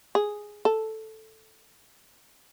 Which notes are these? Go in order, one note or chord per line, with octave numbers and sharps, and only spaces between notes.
G#4
A4